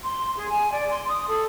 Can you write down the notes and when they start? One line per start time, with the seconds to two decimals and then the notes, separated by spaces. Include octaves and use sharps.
0.03 C6
0.37 G#4
0.49 G#5
0.72 D5
0.90 C6
1.08 D#6
1.28 A4